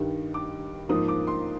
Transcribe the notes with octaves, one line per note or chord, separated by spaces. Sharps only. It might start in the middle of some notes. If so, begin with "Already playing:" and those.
Already playing: G2 D#3 G3
D6
G#2 F3 A#3 D#6
D6
C6